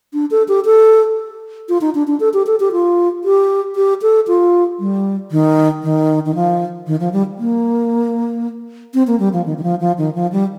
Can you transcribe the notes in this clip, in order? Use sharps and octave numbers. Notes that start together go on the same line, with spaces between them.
D4
A4
G4
A4
F4
D#4
D4
D4
A4
G4
A4
G4
F4
G4
G4
A4
F4
G3
D#3
D#3
D#3
F3
D#3
F3
G3
A#3
C4
A#3
G3
F3
D#3
D#3
F3
F3
D#3
F3
G3